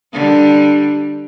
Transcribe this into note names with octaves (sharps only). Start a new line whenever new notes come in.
D3 G3